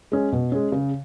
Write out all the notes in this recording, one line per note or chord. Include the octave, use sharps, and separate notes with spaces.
G#3 C#4
B2
G#3 C#4
C#3